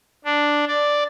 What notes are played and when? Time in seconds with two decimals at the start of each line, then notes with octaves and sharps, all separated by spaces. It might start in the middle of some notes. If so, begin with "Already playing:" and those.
0.25 D4
0.68 D5